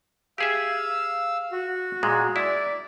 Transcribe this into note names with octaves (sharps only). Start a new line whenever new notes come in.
G4 G#4 E5 F5 E6
F#4
A#2 G#3
E4 D5